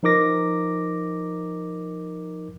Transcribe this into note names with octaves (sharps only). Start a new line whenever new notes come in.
F3 D#4 A#4 D6 A#6